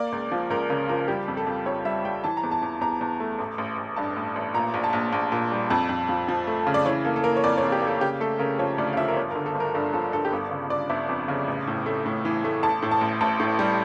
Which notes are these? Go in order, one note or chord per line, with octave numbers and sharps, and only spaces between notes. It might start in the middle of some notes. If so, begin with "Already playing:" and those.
Already playing: A#3 D5
C#2
F3
C#2 A#4
C#3 A#4
F3 A#4
G3 G4
F2
A4
F2
F2 C#5
G3 E5
G3 G5
E3 A5
A#5
E2
A5
E2
E2 A#5
E2
A3
A1
A1
A1
G2 A5
A1
A1
A#2 A#5
A#1
A5
A#1
A#1
A#2
G3
F2 A5
F2
F3
F3
A3
C#3
D5
E3 C#5
A#3 A4
A4
A#3 A#4
C#5
F2 D5
C#5
F2
G4
A#3
A4
C#3 G4
A3 A4
C#3 A#4
F3 C#5
D2 D5
F5
F3 E5
A#4
G1 C#5
A#4
D3
A4
G1
A#4
G2 A4
F3 A4
G2 A4
G4
G1 A4
C#3
G1 D5
G1 E5
F2
C#3
A1
A2
A3
A2
E3
A3
A1 A5
A2
A5
A1
A1 A5
A2
G3